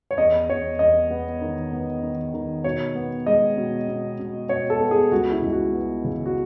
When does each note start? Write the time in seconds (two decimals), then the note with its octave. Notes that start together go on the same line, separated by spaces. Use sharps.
0.11 C#5
0.18 E2 D#5
0.49 E2 C#5
0.79 E2 D#5
1.10 B3
1.41 D#3
1.72 B3
2.02 D#3
2.34 D#3
2.64 B2 C#5
2.95 B3
3.26 G#3 D#5
3.57 B2
3.88 B2
4.19 B2
4.49 B2 C#5
4.70 A4
4.81 B3
4.91 G#4
5.11 C#2 F#4
5.32 E4
5.42 C#2
5.52 F#4
5.72 B3
6.04 C#3
6.26 F#4